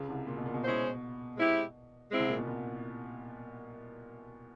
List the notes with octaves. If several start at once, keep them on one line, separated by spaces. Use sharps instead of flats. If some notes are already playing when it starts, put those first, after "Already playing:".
Already playing: C#2 C#3
C2 C3
A#2
B2
A#2
B2
G#3 C#4 E4 G#4 C5
G#3 C4 E4 G4
G#3 C4 E4
C2 C3
A#2
B2
A#2